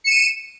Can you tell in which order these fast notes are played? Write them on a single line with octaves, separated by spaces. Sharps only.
C#7 E7 D#7